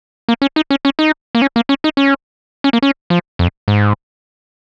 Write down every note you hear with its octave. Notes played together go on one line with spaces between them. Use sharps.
A#3
C#4
D#4
C#4
C#4
D#4
A#3
C#4
A#3
C#4
D#4
C#4
C#4
A#3
C#4
F3
F2
G#2